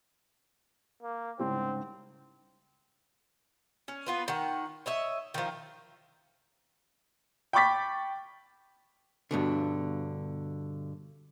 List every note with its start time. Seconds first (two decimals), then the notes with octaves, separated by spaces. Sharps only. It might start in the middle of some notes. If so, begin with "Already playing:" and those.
1.02 A#3
1.39 C2 G#2 C#3 C4
3.88 C#4
4.06 B3 F4 B4
4.28 D#3 F#5
4.86 C#5 D#5 E5
5.34 D#3 F3
7.53 G5 B5 C#6 D6 A6 B6
9.31 G2 B2 D3